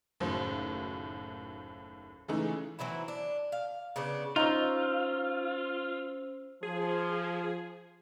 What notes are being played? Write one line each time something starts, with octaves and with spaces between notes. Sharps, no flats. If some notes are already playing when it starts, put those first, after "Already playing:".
F#1 D#2 A2 F#3 C5
C#3 E3 G#3 A3 D#4
E3 F#3 C4 E4
D4
F5
C#3 B3 D4
C#4 D#4 F4 C5 C#5 E6
F3 G#4